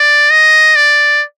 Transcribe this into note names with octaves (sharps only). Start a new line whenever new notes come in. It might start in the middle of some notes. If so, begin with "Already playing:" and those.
Already playing: D5
D#5
D5